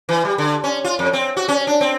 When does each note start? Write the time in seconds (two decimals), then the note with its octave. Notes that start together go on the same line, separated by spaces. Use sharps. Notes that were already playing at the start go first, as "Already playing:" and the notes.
0.09 E3
0.25 G3
0.38 D3
0.64 C#4
0.85 F4
0.99 F2
1.13 C4
1.37 F#4
1.48 C#4
1.67 D4
1.81 C4